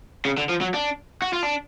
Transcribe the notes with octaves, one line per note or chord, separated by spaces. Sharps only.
C#3
D3
F3
F#3
D4
F#4
F4
D4